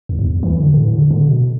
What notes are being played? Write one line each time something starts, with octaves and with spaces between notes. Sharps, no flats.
E2
G2
E2
E3
D3
A2
D3
D3
B2